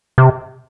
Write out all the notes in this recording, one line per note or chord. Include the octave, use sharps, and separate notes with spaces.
C3